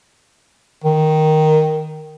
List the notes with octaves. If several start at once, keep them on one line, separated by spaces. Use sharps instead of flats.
D#3